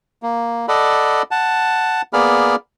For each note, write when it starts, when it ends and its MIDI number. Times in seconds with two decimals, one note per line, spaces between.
0.23 0.66 58
0.68 1.22 69
0.68 1.22 74
0.68 1.22 75
0.68 1.22 78
0.68 1.22 83
1.31 2.02 78
1.31 2.02 81
2.13 2.56 58
2.13 2.56 59
2.13 2.56 68
2.13 2.56 74
2.13 2.56 83
2.13 2.56 89